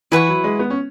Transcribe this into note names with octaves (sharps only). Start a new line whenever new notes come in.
E3 E4 B4 F#5 C#6
F#3
G#3
B3
C#4